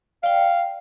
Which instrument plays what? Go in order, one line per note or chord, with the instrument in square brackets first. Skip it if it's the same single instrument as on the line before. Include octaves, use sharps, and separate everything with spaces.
[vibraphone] D5 G5 [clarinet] F5